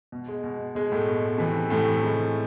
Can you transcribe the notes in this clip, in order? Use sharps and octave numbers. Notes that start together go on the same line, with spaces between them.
B2
G#3
B2
B2 G#3
A2 A3
B2
C3 E3
A2 C3 E3 A3
C3 E3 G#3